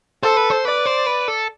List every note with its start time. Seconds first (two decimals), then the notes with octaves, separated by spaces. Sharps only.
0.23 A4 C5
0.37 B4
0.50 C5
0.65 B4 D5
0.86 C5
1.06 B4
1.28 A4